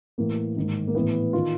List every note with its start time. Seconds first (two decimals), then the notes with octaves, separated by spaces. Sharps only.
0.18 A2 E3 A#3
0.56 G#2 D#3
0.87 A#3
0.95 A2 E3 B3
1.33 D#3 F4